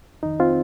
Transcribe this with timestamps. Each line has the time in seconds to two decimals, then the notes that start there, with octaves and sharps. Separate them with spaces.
0.23 F2 D#3 D#4
0.40 C4 F4